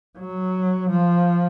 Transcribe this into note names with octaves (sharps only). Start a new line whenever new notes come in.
F#3
F3